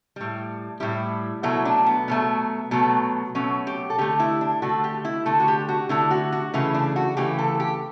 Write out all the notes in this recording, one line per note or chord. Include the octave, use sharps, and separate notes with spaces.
A2 G3
A2 G3 E4
B2 F#3 A3 E4
D4
B3
B2 F#3 A3
B2 F#3 A3
B2 F#3 A3 C#4
G4
A4
D3 A3 G4
E4
D4
D3 A3 F#4
G4
E4
D3 A3
F#4
G4
F#4
D3 A3 E4
F#4
F#4
C#3 E3 A3 E4
D4
F#4
C#3 E3 A3 G4
A4
G4